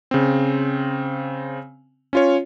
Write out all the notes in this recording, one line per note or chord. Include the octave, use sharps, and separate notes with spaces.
C#3 C4
C#4 F4 C#5